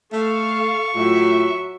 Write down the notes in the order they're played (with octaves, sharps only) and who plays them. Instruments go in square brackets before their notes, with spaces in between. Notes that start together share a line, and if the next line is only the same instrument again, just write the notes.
[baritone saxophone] A3 [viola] A4 F5 [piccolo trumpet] C#6
[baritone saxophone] A2 [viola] F#3 E5 [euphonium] F4